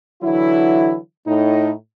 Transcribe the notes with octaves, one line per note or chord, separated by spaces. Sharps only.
D3 E3 F#3 E4
A2 D#4